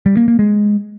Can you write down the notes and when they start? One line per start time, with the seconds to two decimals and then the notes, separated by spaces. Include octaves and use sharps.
0.06 G3
0.17 A#3
0.28 A#3
0.39 G#3